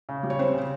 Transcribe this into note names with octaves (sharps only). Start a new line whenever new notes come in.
C#3
G3
C#5
C4 C5
C#3